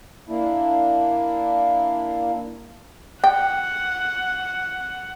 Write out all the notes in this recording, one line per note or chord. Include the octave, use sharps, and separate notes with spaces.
A#3 D4 E4
F#5 G5